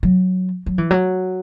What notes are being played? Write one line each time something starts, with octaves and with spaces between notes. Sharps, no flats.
F#3
F#3
E3
F#3